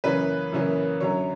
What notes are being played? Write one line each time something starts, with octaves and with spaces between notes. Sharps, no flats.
F#2 C#3 E3 A#3 C#4 B4
F#2 C#3 E3 A#3 C#4
F#2 D3 F#3 C#5